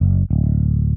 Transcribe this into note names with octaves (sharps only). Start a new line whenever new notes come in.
F#1
D1